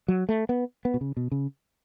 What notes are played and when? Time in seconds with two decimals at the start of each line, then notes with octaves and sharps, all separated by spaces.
0.08 F#3
0.29 A3
0.49 B3
0.85 B3
0.94 B2
1.01 C#3
1.17 B2
1.32 C#3